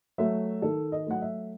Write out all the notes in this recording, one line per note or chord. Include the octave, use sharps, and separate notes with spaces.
F#3 A3 E5
D#3 A4
D#5
F#3 A3 F#5
E5